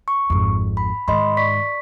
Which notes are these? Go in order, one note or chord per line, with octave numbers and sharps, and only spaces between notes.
C#6
G#1 F2
B5
G#2 D#3 D#5 B5 C6
D5 C#6 B6